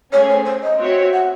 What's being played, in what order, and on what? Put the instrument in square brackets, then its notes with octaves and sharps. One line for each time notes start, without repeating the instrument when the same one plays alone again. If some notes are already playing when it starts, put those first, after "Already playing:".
[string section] A3 C#4 G#4 [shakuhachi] C#5
[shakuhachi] C5
C5
D#5
[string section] C4 F#4 C#5 E5
[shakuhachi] F#5